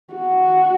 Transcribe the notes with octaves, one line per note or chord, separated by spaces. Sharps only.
F#4